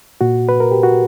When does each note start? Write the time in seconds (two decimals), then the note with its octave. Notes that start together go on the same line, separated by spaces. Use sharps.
0.21 A#2 F#4
0.49 B4
0.60 A#4
0.71 G4
0.83 F#4